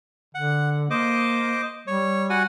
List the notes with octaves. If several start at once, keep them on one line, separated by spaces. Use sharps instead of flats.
D3 F#5
A#3 C5 D#5 D6
G3 C#5
F#4 F#5 G#5